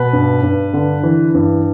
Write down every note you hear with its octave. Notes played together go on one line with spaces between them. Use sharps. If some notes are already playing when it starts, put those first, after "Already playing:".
Already playing: B2 B4
G2
G2
D3
E3
G2